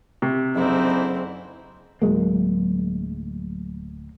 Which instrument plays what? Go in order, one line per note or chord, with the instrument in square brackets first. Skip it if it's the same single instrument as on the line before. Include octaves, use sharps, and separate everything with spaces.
[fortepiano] C3
[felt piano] F#1 [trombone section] D3 E3 D#4 [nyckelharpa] C4 E4
[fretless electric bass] D1 F#3 G#3 A#3